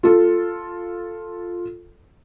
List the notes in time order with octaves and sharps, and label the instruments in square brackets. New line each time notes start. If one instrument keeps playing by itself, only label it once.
[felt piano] F4 A4